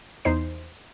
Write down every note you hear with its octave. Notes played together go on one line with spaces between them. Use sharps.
E2 D#4 C5 C7